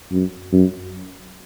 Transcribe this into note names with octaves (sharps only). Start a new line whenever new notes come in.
F#2
F#2